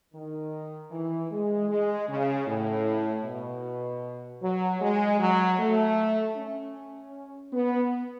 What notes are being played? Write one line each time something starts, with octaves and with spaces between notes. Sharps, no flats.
D#3
E3
G#3
G#3
C#3
A2
B2
F#3
G#3
F#3
A3
C#4
B3